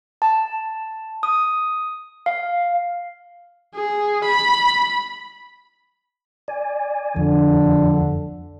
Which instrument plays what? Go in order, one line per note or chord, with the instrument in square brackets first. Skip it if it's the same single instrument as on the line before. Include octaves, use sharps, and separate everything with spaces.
[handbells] A5
D#6
F5
[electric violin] G#4
B5
[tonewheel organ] D5 G#5
[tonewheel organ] F2 F3 [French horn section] D3